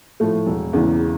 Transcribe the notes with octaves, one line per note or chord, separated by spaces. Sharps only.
A2 F3 A3
E1
E2 C#3 E3